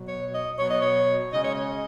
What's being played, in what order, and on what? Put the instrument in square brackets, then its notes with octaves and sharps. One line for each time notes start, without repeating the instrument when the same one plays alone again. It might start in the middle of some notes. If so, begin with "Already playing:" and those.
Already playing: [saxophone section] B2 F#3
C#5
D#5
B2 F#3 C#5
D#5
C#5
C#3 G#3 D#5
C#5
D#5